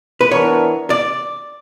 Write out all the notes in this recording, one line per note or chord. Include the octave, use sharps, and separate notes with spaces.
B4
E3 B3 D4 A#4 C#5
D5